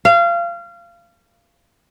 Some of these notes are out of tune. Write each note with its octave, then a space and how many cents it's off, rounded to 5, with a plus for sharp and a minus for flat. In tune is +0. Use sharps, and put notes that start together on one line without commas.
F5 -25